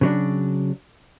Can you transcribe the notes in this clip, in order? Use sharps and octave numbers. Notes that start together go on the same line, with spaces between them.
C#3 F#3 D4